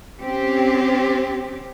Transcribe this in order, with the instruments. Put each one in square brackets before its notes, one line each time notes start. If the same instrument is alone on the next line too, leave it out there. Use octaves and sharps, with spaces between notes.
[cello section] C4 C#4 G4